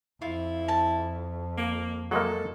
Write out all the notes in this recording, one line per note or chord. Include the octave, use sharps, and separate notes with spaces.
F2 E4 F4
A5
A#3
F#3 G#3 A#3 A4